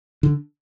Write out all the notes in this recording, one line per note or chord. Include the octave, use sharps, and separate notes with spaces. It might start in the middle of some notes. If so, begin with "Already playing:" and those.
D3